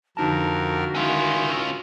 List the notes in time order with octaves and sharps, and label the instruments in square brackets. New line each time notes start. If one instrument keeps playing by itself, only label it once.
[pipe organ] F2 A#4 [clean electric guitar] D3 D#4 A5 [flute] F#4
[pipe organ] D#3 E4 [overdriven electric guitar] C#4 F4